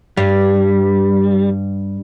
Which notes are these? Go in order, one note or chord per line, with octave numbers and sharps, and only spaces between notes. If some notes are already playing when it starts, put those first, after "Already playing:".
G2 G3